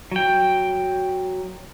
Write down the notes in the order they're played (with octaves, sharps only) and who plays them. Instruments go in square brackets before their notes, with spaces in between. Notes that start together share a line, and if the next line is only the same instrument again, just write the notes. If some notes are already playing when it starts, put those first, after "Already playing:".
[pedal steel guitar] F#3 G5